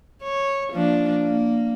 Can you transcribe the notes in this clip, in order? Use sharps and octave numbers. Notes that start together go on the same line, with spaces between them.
C#5
F3 A#3 D4
A#3